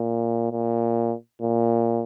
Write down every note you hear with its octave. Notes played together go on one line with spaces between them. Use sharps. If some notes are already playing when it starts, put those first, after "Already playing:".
Already playing: A#2
A#2
A#2